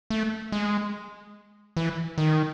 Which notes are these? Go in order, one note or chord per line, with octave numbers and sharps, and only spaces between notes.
A3
G#3
E3
D#3